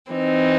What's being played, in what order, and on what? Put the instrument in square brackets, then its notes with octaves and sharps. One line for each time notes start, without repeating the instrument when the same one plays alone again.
[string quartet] E3 C4 D#4